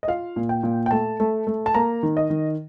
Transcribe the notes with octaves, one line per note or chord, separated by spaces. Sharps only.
D#5
F4 F5
A#2
G5
A#2
G5
A3 A5
A3
A3
A5
A#3 A#5
D#3
D#5
D#3